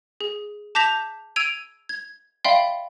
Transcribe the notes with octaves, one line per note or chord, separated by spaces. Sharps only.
G#4
A5 D6 G6 A#6 B6 F7
E6 G#6 D7 D#7 F7
G#6
D5 E5 F5 G5 B5 C6